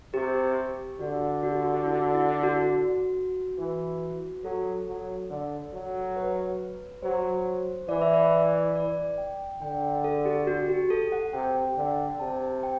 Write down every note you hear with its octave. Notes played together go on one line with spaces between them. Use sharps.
C3 G4
D3 F#4
F#4
G4
F#4
F#4
E4
E4
F#4
E3
F#3 A4
F#3
D3
F#3
B4
F#3 C5
E3 D5
E5
D5
D5
G5
D3 G5
A4
G4
F#4
G4
A4
F#5
C3 G5
D3
C3 A5
G5